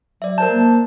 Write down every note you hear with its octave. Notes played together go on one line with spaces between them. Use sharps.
F#3 D5 E5
A#4 C5 A5 G6
A#3